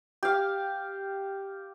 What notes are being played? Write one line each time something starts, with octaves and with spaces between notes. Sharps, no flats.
G4 F5